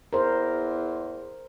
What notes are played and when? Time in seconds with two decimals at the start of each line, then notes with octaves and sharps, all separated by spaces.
0.13 E2 A#4 C5